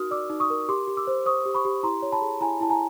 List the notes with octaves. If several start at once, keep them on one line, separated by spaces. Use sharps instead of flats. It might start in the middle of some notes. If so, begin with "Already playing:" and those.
Already playing: D#4 F#4 A#4 D#6 F6
D5 D6 E6
D#4
C#6 D#6
A#4
G4 C6 D6
G4
D6 E6
C5
C5 C#6 D#6
G4
B5 C#6
G4
E4 A#5 C6
C#5
A5 B5
G#4
E4 G#5 A#5
E4 A5
G#5 A#5